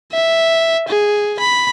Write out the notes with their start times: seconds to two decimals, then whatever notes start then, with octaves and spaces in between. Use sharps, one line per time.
0.12 E5
0.88 G#4
1.39 B5